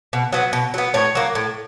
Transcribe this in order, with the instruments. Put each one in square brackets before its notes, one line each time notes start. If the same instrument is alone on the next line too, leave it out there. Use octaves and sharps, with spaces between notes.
[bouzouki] B2
F#3 B3
B2
F#3 B3
A2 C#5
F#3 A#3
A2